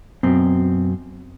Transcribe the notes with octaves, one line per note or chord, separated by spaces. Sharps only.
F#2 B2 C4